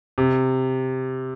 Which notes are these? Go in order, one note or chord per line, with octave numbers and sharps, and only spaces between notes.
C3